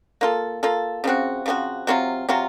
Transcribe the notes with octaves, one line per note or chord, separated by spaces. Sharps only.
A#3 F4 A4
A#3 F4 A4
C#3 F3 C4 F#4
C#3 F3 C4 F#4
C3 F#3 C4 F4
C3 F#3 C4 F4